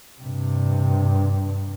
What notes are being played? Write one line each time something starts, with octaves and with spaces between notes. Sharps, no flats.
G2 C3